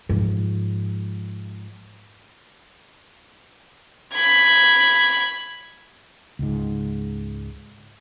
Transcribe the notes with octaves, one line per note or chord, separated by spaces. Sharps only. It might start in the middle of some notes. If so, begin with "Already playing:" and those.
G#2 F3
B5 G#6
C#2 G#2